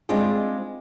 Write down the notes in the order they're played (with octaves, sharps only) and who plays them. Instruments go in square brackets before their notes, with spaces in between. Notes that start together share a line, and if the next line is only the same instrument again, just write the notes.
[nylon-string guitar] G3 G#3 C4 D4 F4 G4